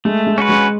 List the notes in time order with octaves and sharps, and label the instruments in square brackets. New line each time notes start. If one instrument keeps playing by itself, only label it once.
[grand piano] G#3 [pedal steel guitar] A3
[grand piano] G#3
[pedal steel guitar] C#4 F#4 B4
[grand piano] G#3